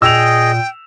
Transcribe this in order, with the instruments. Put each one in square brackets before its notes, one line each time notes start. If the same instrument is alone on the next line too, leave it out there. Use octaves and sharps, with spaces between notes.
[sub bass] A#2 [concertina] G#4 D#5 [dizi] G5 [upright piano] E6 F7